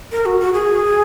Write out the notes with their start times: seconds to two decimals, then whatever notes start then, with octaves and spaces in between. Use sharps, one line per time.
0.12 A#4
0.26 F#4
0.40 F#4
0.53 G#4